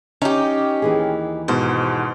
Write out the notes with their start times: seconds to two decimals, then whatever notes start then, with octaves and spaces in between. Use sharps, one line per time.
0.22 C#4 D#4 G4
0.82 D#2 E3 G#4
1.48 G#2 B2 C5